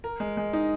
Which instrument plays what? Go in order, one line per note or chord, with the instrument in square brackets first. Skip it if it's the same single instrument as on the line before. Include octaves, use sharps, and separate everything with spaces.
[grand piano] A#4
G#3
G#3
D#4